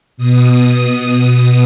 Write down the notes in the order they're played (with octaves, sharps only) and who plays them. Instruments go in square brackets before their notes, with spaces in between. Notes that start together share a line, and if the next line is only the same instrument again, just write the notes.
[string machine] B2 D#6